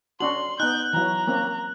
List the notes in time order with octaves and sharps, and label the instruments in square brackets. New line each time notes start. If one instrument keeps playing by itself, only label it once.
[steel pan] C#4 D4 F#4 [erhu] C6 [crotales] F#7
[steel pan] B3 D#4 [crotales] F#6 [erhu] G6
[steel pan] E3 F#3 [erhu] A#5
[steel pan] A#3 C4 C#4